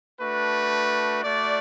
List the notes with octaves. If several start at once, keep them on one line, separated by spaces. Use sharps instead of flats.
A3 D4 F#4 B4
A3 F#4 D5